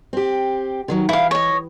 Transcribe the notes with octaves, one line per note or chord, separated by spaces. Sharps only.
C4 G4
D3 D#3 F#3
E3 E4 F5
C#5 D#5